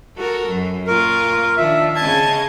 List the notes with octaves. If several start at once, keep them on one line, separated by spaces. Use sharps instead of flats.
F#4 A4 A#4
F#2
A#2 F4 A#4 C#6
D#3 F3 D4 E5
C#3 D#5 A5 G#6